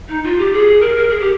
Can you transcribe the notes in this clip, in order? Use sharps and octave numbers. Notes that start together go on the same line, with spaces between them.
D#4
F4
G4
G#4
A#4
A#4
G#4
G4